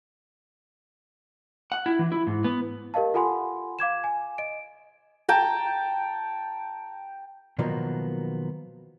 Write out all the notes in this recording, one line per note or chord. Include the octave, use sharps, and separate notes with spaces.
F#5
E4
E3
E4
G#2
B3
G4 A#4 D#5 F5 A5
F4 A4 F#5 G#5 B5 C6
F5 D6 G#6 E7
G#5
D#5 D7
G5 A5 A#5
B2 D#3 F3 F#3 A#3 B3